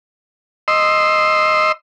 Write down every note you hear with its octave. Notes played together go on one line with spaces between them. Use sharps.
D#5 C6 E6